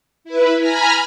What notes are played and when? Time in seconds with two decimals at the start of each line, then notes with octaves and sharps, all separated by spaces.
0.24 E4 B4
0.59 G#5 A#5 B5 F6